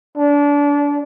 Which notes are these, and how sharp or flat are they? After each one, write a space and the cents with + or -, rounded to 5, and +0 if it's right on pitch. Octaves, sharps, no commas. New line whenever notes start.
D4 -25